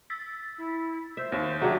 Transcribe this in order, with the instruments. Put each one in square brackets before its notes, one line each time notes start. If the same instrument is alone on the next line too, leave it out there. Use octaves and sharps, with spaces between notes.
[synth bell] E6 A6 B6
[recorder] E4
[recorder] C5 [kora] E5
[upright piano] D#2
[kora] F#3 D4 G4 [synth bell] G#4 E5 [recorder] A#5